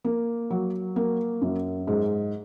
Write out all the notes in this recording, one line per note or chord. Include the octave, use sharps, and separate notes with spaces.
A#3
F#3
A#3
F#2
G#2